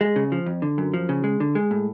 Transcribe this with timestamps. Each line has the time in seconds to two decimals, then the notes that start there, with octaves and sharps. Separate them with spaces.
0.01 G#3
0.16 C#3
0.32 F3
0.46 F2
0.62 D3
0.78 F#2
0.94 F3
1.09 C#3
1.24 G#3
1.40 D3
1.55 G#3
1.71 A2